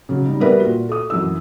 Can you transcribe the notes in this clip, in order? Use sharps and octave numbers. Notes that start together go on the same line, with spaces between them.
C#3 F#3
G3 D#4
G3 B3 A#4 B4 D5 E5
A#2 F#4
A4 D#6
F#2 E3 E6